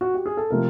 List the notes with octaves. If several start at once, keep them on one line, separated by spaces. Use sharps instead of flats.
F#4
G4
G#4
A4
C3 F3 A3 A#4